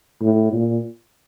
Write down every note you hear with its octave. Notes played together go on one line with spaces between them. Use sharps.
A2
A#2